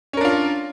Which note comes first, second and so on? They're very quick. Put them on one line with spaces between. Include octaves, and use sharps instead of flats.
C#4 A#4 D4 F4